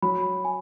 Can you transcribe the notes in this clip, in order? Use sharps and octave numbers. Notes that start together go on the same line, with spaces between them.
F#3 B5
G#5